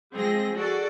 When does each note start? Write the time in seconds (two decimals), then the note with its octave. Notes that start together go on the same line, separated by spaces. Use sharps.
0.14 F3 G#3 C4 G#4 A#6
0.57 F#4 G#4 A4 D5